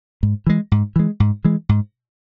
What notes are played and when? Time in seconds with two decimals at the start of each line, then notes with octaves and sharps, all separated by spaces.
0.23 G#2
0.47 E3 G#3
0.72 G#2
0.96 E3 G#3
1.20 G#2
1.45 E3 G#3
1.69 G#2